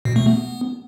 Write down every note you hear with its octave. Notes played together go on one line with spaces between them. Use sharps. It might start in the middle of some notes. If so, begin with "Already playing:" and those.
B2
A3
B3